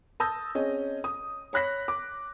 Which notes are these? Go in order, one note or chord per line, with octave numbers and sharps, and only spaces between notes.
A5 D#6 E6 G6 A#6
C4 C#4 G#4 D#5
D#6
C#5 B5 F#6 A#6 B6
D6